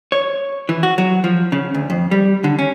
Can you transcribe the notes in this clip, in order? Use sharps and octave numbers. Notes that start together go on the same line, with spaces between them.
C#5
E3
F#4
F#3
F3
C#3
D2
F2
G3
D3
C#4